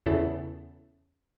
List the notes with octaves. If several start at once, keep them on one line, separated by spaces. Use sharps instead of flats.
E2 C#3 E4 A4